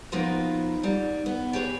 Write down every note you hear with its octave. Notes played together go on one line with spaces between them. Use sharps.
F3 A#3 B3 D#4 F4 F#4
G#2 G3
B3
G4 G#4 B4 C#5